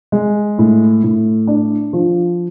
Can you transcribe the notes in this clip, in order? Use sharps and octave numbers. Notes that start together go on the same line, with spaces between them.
G#3
A2
A2
D4
F3